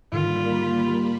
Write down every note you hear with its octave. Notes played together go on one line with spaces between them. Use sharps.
G#2 D3 D#3 G3 A#3 F4 B5